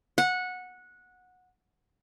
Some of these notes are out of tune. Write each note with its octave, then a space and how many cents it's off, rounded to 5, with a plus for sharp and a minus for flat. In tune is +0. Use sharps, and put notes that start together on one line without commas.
F#5 -15